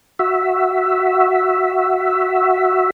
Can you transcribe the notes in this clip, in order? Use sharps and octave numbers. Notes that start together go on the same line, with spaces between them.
F#4 E5